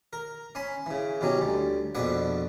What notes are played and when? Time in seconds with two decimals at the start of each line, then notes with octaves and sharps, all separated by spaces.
0.13 A#4
0.55 C#4 G#5 B5 C6
0.86 C#3 E3
1.21 B2 E3 F#3 C#4 G4
1.41 D2 G3
1.95 A#1 F2 B2 D4 B4 F#5